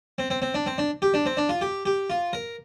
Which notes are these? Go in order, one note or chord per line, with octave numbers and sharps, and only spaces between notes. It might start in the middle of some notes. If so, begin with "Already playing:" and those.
C4
C4
C4
D4
C4
D4
G4
D4
C4
D4
F4
G4
G4
F4
A#4